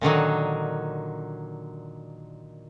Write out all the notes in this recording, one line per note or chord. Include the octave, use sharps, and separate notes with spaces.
A#2 D3 D#3 F#3